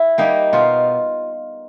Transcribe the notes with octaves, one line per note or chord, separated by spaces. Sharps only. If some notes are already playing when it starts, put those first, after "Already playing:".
Already playing: E4
G3 A#3 D#4
B2 F4